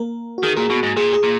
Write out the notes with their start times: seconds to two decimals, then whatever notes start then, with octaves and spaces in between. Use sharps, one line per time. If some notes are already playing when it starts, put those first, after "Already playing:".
Already playing: A#3 A#4
0.38 F#4
0.43 D#3 G#4
0.56 A#2 G#4
0.70 B2 F#4
0.83 G#2
0.96 A#2 G#4
1.13 G#4
1.23 A#2